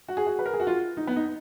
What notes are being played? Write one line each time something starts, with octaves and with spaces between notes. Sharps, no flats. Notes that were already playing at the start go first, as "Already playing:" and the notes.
F#4
G#4
F#4
B4
A#4
G#4
F#4
F4
D#4
B3
D#4